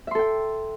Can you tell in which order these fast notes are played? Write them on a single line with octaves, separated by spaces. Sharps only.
E5 C6 A4 G5